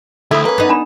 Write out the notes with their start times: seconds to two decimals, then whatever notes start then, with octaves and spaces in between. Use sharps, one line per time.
0.31 D2 E4 A4 D#6
0.45 A#3 C#4 B4
0.58 B3 D#4
0.69 D4 B5